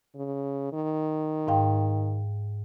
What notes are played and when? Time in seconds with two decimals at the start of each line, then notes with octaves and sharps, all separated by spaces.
0.15 C#3
0.73 D#3
1.47 G#2 F5 G5